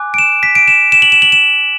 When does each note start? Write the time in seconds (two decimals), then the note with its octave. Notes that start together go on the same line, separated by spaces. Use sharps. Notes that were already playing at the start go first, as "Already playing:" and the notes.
Already playing: G#5 D6 F#6
0.14 D7
0.18 E7
0.43 B6
0.55 D7
0.68 E7
0.92 E7
1.02 F#7
1.12 E7
1.22 F#7
1.32 E7